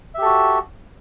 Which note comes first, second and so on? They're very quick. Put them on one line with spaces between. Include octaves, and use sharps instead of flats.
E5 G4 A4 F#4